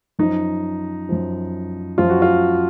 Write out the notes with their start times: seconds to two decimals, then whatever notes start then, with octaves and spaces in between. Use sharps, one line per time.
0.19 F#2 F3 D#4
1.09 F#2 F3
1.98 F#2 F3 F4
2.10 F#4
2.22 F4